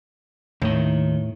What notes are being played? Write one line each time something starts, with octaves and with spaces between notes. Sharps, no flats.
D#2 A2 D#3